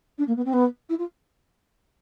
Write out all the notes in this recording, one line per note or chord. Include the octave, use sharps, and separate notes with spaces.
D4
A#3
B3
C4
B3
E4
F4